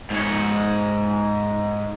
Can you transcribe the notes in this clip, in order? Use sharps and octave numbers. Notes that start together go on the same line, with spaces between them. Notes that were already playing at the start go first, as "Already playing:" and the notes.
G#2 C#5